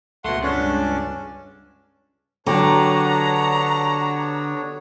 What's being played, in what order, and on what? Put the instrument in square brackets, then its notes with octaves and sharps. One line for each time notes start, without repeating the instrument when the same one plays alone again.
[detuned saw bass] C#2 [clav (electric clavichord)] B2 A3 [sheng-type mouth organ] F#5 C6
[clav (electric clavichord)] G2 C#5 F#5 [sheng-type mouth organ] C#4 D4
[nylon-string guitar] D3 [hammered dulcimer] F#3 G4 [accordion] B3 D4 C#5 [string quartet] F#5 A#5